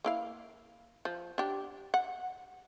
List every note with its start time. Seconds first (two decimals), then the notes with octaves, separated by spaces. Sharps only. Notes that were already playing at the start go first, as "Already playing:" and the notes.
0.05 A#3 E4 F5
1.05 F3
1.38 D4 G4
1.94 F#5